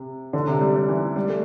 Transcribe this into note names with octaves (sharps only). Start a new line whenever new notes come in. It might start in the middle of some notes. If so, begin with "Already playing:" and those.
Already playing: C3
D3
C3
G3
G3
E3
G3
A3